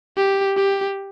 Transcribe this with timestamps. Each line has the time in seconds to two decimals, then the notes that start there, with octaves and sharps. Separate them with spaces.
0.17 G4
0.57 G4